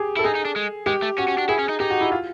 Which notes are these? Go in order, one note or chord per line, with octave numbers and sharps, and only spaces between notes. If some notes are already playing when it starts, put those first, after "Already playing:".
Already playing: G4 G#4
E4 A4
D#4 G#4
D#4
D4
G#3
G#3 G4
A3
C#4 F#4
C#4
D4
E4 G#4
C#4
D#4
D#4 G4
F#4
E4
F4